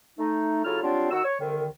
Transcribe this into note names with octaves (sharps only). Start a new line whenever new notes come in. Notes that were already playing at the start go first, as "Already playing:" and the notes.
A3 D#4
C#3 F#3 E4 F4 A4 F6
F#3 G3 C4 D4 F4
D#3 F#4 F#5 E6
C#5
C2 D3 D#3